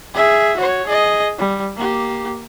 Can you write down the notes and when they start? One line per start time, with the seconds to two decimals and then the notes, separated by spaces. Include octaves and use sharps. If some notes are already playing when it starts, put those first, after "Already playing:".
0.14 G#4 E5
0.56 F#4 C#5
0.87 G#4 D#5
1.38 G3
1.76 A#3 G4